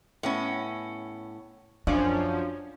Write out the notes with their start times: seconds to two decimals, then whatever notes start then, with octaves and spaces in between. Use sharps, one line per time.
0.23 A2 B3 C#4
1.87 F#2 F3 C#4 D4 D5